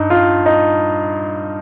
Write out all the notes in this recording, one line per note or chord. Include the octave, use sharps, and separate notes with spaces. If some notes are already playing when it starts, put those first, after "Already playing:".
Already playing: G2 D#4
F4
D#4